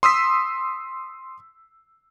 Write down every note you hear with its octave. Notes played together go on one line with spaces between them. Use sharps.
C6 D#6 E6 B6